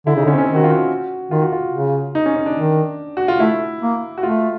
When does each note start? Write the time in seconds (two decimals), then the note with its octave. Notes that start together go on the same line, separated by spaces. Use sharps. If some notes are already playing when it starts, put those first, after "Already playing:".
0.06 D3 E4
0.16 C#3 D#4
0.25 D3
0.27 C#4
0.33 C4
0.38 C#4
0.49 D#3
0.56 F#4
0.64 F4
0.71 F#4
1.31 D#3 F4
1.42 F#4
1.52 F4
1.74 C#3
2.15 D#4
2.26 C#4
2.36 C#4
2.46 D4
2.57 D#3
3.17 F#4
3.28 F4
3.40 A3 E4
3.82 A#3
4.18 F#4
4.23 A3 F4